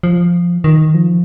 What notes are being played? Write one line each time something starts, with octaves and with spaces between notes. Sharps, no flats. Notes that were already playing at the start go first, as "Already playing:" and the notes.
F3
D#3
F3